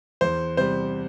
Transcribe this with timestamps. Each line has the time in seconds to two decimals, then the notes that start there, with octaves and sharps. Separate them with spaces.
0.21 E2 C5
0.57 C3 G3 C5